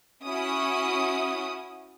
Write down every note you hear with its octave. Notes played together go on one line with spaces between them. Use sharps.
C#4 E4 F#4 D#6